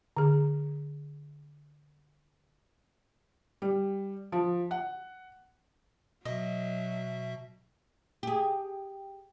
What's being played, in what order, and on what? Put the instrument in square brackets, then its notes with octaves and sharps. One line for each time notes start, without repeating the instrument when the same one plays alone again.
[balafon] D3 G#4
[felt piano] G3
F3
F#5
[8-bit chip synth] B2 E5 [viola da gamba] F#3 [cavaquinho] D#5
[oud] G4 G#4